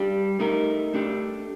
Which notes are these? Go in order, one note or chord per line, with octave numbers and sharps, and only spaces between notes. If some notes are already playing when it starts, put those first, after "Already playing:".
Already playing: G3 D4 G4
A3 D#4 A#4
A3 D4 G4